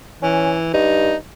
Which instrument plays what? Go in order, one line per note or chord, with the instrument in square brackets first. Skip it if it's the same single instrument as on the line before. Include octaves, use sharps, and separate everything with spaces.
[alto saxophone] E3 [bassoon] C#4
[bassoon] G2 [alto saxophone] D#4